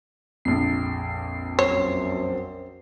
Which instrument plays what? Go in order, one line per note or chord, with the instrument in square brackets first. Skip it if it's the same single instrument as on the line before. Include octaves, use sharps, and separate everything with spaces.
[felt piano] A#1 F2 [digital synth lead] C7
[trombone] F#2 [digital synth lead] C5 [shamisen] C#5